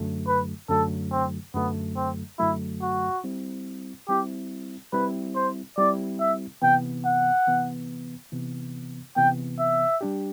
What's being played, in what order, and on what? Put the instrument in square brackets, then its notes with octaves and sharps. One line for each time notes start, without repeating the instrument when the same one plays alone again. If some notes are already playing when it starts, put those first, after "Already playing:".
Already playing: [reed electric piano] F#2 D3 F#3 A3
[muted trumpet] B4
[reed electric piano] F#2 D3 F#3 A3 [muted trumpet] A4
[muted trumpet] C4
[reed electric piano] F#2 D3 F#3 A3 [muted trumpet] B3
[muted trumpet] C4
[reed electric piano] F#2 D3 F#3 A3 [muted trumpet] E4
[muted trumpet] F#4
[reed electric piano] G3 C4 E4
[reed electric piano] G3 C4 E4 [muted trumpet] G4
[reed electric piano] G3 C4 E4 [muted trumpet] B4
[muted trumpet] C5
[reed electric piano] G3 C4 E4 [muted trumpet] D5
[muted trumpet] E5
[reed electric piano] C3 E3 B3 [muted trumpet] G5
[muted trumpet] F#5
[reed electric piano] C3 E3 B3
C3 E3 B3
[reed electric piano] C3 E3 B3 [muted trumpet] G5
[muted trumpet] E5
[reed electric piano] G3 D4 G4